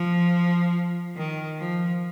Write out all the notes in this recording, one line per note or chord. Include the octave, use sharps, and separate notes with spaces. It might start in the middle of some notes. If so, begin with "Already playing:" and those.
Already playing: F3
D#3
F3